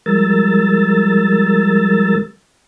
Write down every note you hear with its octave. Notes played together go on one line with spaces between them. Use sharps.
F3 G3 G#3 A#4 E6 A6